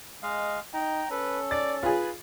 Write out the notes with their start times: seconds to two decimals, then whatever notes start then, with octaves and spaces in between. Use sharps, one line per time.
0.23 G#3 D#5 F5
0.74 D#4 G5 A#5
1.10 C#4 A4 B4
1.51 D5 A6
1.83 F4 G#4 B4